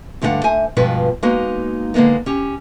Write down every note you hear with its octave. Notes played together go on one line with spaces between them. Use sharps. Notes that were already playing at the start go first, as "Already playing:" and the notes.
G2 D3 A3 G4 F5 F#5
C5 E5 G#5
G2 B2 F3 G#3 F4 B4
G#3 A#3 B3 D#4 F#4
D3 G#3 A#3 B3 D#4
C#4 G4